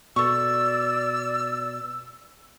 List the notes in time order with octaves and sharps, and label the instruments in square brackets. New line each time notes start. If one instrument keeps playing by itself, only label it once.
[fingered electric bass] B2 [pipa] A4 C#6 [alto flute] D5 [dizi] E6